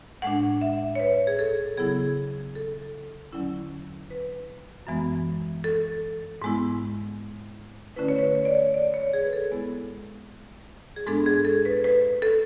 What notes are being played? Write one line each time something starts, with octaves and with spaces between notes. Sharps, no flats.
A2 G#3 D4 F#5
E5
C#5
B4
G#4
A4
C#3 F#3 B3 E4 G#4
A4
E2 D3 F#3 C#4 E4
B4
F#2 E3 G#3 B3
A4
G#2 G#3 B3 E4
D3 A3 C#4 E4 B4
C#5
B4
C#5
D5
C#5
D5
C#5
G#4
B4
A4
G#2 G#3 B3 E4
G#4
G#2 G#3 B3 D4 A4
G#4
A4
B4
B4
A4